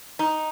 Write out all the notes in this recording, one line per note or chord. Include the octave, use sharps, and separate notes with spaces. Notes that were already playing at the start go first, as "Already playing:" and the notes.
D#4